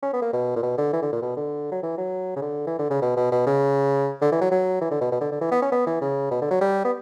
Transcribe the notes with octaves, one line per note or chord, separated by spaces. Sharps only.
C#4
B3
A#3
B2
A#2
B2
D3
E3
D3
A#2
B2
D3
F#3
E3
F#3
C#3
D3
E3
D3
C#3
B2
B2
B2
C#3
D3
E3
F#3
F#3
E3
D3
B2
B2
D3
D3
E3
B3
C#4
B3
E3
C#3
B2
D3
F#3
G3
B3